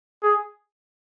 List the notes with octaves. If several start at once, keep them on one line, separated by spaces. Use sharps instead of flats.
G#4